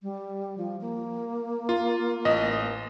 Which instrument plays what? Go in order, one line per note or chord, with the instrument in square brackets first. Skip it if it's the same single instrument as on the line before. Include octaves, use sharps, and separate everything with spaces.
[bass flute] G3
F3
A#3
[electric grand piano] F4
A1 D#5